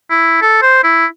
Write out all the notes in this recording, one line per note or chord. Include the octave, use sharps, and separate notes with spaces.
E4
A4
C5
E4